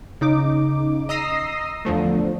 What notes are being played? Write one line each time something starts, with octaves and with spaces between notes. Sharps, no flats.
C#3 D#4 D6
D#5 A#5 D#6 E6 A#6 C7
E2 D3 F3 A3